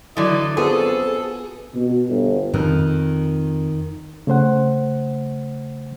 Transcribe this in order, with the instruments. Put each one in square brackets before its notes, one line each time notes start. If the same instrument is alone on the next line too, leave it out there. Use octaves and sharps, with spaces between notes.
[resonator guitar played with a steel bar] D3 E3 [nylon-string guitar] F#3 [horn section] E4 D5 D#5
[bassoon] F2 [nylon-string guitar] B3 F4 F#4 [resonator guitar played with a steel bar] G#4 [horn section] A4
[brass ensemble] B2
G1
[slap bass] F2 [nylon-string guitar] D#3
[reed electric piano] C#3 A3 C5 F#5